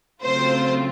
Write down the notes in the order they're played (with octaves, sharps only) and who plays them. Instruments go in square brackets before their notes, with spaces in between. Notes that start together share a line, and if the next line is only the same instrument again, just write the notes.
[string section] C#3 F#3 A3 C4 F4 C5